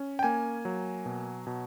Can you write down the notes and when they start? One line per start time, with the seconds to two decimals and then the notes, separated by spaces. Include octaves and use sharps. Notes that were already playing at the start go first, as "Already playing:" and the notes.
Already playing: C#4
0.19 G5
0.23 A#3 G#5
0.65 F#3
1.06 B2
1.47 B2